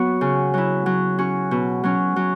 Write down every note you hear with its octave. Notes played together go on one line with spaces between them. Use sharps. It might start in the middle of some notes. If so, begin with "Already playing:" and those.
Already playing: F#3 B3 F#4
C#3
F#3 E4
F#3
C#4 F#4
B2
F#3 C#4
F#3